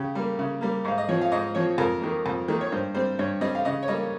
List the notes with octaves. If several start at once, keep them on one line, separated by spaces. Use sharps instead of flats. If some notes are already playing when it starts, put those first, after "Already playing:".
Already playing: C#3 G4
G3 A#3
C#3
G3 A#3
G#2 F5
D#5
F3 C4 C#5
F5
G#2 D#5
F3 C4 C#5
F2 A#4
D#3 A#3
F2
D#3 A#3
C#5
G2 C5
G3 C4 C5
G2 C#5
G3 C4 D#5
F5
C#3 D#5
C#5
G3 A#3 D#5